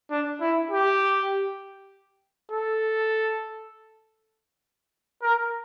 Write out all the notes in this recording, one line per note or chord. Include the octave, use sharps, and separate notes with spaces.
D4
E4
G4
A4
A#4